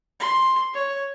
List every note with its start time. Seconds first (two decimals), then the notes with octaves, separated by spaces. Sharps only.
0.20 C6
0.74 C#5